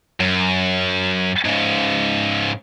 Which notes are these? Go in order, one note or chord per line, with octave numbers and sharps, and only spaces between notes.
F#2
G#2 C#3